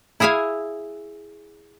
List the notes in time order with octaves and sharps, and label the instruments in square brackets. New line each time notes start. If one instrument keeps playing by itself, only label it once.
[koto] E4 G#4 E5 F5 G#5